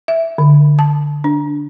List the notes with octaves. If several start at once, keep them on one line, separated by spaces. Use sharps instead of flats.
E5
D3
A5
D4